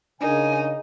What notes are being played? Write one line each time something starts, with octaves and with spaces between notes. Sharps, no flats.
C#3 D4 D#4 A#4 G#5